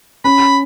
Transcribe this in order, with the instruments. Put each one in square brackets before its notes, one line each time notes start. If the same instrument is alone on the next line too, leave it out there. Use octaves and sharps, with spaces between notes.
[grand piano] C#4 [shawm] B5